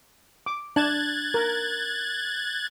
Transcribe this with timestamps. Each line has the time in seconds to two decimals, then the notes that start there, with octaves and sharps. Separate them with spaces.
0.46 D6
0.76 D4 A5 F#6 G#6 A6
1.34 A#4